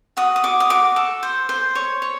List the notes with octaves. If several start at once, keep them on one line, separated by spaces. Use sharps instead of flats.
F#4 D#6
D#6
F#4 D6
D#6
F#4 D6
A4
C5
C5
C#5
C#5